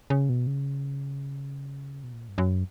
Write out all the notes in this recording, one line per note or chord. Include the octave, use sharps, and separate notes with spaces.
C#3
B2
C#3
B2
A#2
G2
F#2